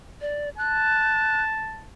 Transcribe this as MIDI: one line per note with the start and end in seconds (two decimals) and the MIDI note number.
0.21 0.50 74
0.58 1.86 81
0.58 1.42 90